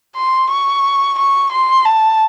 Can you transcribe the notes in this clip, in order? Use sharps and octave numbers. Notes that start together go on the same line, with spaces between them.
C6
C#6
C#6
C6
A5